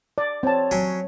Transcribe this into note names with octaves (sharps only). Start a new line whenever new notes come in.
D5
C4 C#5 A5
F#3 C#4